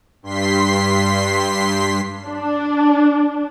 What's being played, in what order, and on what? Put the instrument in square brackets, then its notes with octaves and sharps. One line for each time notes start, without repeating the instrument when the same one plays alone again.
[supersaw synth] G2 C6 B6 C7
[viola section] D4